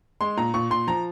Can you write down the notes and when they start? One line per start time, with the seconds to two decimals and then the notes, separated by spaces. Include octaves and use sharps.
0.21 G#3 C6
0.37 A#2 A#5
0.54 A#2 C#6
0.70 A#2 C6
0.88 F3 A#5